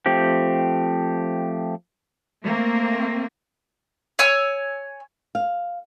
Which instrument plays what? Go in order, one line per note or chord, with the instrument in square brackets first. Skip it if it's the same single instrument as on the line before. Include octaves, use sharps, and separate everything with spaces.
[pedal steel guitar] F3 A3 C4 G4
[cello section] A3 A#3 C4
[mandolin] C#5 G#5 E6
[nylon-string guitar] F5